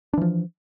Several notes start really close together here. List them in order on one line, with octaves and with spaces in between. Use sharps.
D4 E3 F3